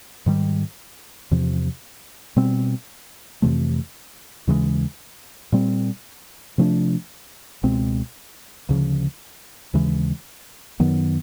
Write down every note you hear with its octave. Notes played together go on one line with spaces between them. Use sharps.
G#2 D#3 G3
E2 C3 F3
B2 G3 C4
F2 C3 E3 A3
D#2 C#3 E3 G#3
A#2 G3 C4
C3 F3 A3 D4
C#2 B2 G#3 C4
D2 C#3 F3
D#2 C#3 E3 G#3
F#2 D#3 F#3 B3